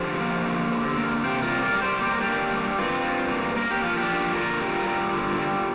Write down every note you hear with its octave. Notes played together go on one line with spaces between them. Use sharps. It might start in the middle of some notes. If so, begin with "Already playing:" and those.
Already playing: D3 F3 G4 C5
A#3
D3
D3
A#3
C3 G4 C5
F4 A#4
G3
A#4 D5
G3
G4 C5
A#3 G4
A#4
D4 G4
A#3
G3
G2 C4 F4
G2
A#3
A#3 A#4
G4
F3 F4
D4 G4
A#3
D3 F4 A#4
G3
G3
D3
G3